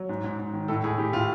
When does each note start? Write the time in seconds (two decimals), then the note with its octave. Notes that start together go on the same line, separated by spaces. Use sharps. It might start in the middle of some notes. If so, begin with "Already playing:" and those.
Already playing: F#3
0.09 G#2
0.24 G#2
0.39 G#2
0.53 D#3
0.68 A2 A4
0.84 A2 G#4
0.98 A2 G4
1.13 A2 F4